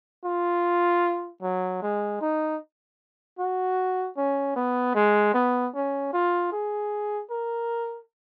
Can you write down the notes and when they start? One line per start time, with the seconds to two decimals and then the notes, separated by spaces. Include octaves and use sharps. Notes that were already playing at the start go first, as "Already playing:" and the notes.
0.24 F4
1.42 F#3
1.82 G#3
2.21 D#4
3.39 F#4
4.17 C#4
4.56 B3
4.95 G#3
5.34 B3
5.75 C#4
6.13 F4
6.52 G#4
7.30 A#4